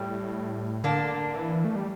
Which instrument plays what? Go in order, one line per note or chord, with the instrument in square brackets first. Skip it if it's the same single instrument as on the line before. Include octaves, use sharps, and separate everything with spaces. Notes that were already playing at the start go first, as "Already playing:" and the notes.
Already playing: [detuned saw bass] A2 [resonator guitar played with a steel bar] G3
[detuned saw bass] D3 [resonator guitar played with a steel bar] A#3 D4
[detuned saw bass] D3
E3
A3
G3